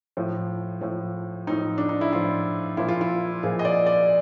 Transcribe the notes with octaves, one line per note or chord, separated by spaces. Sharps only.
A2 F3
A2 F3
A2 F3 D#4
D4
D#4
E4
A2 F3 F4
A#2 F3 E4
F4
E4
A#2 F3 G#4
D#5
D5
D5